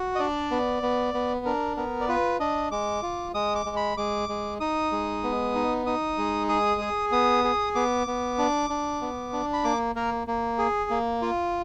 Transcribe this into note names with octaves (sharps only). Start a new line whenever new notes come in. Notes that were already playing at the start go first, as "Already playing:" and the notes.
Already playing: F#4
D#5
D4 D5
B3
B3
B3
D4 A#4
B3 A#4
D5
F4 B4
D4 D#5
G#3 D6
F4
G#3 D#6
D6
G#3
B5
G#3 D6
G#3
D#4 D#6
G#3
B3
D#4
D#4 D#6
G#3
G#4 D#6
G#4
B3 D#6
G#4
B3 D6
B3
D4
D4
B3
D4
B5
A#3 D6
A#3 A#4
A#3
G#4
A#3
F4